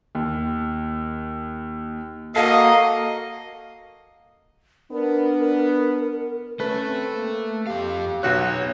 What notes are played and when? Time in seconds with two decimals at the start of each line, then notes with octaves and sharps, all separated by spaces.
0.15 D#2
2.36 A#3 F#4 A4 A#4 D#5 F5
4.92 B3 D4 A#4
6.60 A3 C#4 A4 B4
6.85 C4
7.16 A#3
7.67 F2 G4 F5
8.23 B1 B3 F#4 C#5 F#6